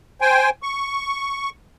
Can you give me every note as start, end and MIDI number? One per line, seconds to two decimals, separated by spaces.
0.21 0.50 72
0.21 0.50 79
0.21 0.50 80
0.63 1.50 85